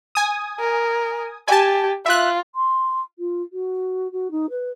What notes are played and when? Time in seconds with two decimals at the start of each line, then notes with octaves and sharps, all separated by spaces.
0.15 G#5 D#6
0.60 A#4
1.48 G4 G#5 A5
2.06 F4 E5 F#6
2.55 C6
3.19 F4
3.53 F#4
4.12 F#4
4.31 D#4
4.50 B4